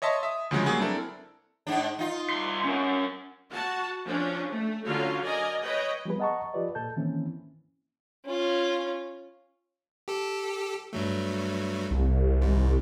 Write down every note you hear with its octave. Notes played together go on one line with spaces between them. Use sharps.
C#5 D#5 E5 A5 C6
E5 D#6
D2 C#3 F3 F#3 G#3
F#3 G3 A#3 G#4
C4 D4 E4 A4 A#4
G#2 D4
D#4 F4
C2 C6
C#4 A#4
F#4 F#5 A5
F3 C#4 D4
A3
D3 F#3 C#4 F4 A4 F5
A#4 D5 D#5 G#5
B4 C#5 D#5 G5
F3 G3 B3 G#4 B4
D#5 F#5 A5 A#5 C#6
F3 F4 G4 B4 D5 D#5
A#2 A4 A5 G6
D#3 E3 A#3 C4 C#4 E4
C#4 F4
G4 A4
G2 F#3 A3
C2
G#1 G#2